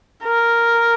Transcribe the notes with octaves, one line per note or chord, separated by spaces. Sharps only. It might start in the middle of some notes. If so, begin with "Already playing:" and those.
A#4